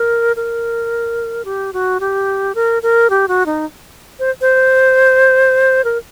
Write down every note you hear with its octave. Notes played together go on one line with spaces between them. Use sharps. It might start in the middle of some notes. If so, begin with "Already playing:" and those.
Already playing: A#4
A#4
G4
F#4
G4
A#4
A#4
G4
F#4
D#4
C5
C5
A#4